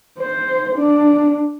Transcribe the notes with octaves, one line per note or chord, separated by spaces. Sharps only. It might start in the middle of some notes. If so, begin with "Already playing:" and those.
C5
D4